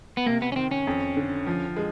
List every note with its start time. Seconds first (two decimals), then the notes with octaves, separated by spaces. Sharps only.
0.17 B3
0.26 C3 A#3
0.42 B3
0.52 C#4
0.56 D#3 C4
0.71 C#4
0.87 F2
1.16 D3
1.47 F3
1.77 G#3